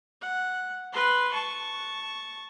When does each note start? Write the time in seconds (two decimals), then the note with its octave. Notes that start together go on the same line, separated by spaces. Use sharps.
0.21 F#5
0.93 B4 C6
1.31 A5 C#6